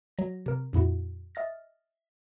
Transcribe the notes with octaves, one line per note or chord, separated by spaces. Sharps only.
F#3 A#6
C3 A#4
F2 A#2 E4 F#4
D#5 E5 F6 A6 A#6